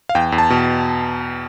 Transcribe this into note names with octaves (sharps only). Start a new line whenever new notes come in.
F5
E2 G5
E2
A5
B2